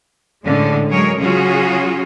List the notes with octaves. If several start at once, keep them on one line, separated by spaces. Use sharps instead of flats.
A2 D3 G#3 C#4
F#3 G#3 G#4 A#4 C#5
C#3 F#3 C#4 F4 F#4 G#4